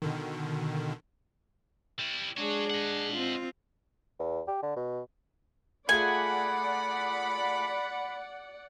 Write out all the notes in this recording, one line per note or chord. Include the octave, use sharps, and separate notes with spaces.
B2 D3 D#3
G3 E4
G#3 D4 F#4 G#4 C#5
D#5 F#5
C4 F4
E2
G4
D3
B2
A3 F4 G#4 D5 F#5 G#5 B5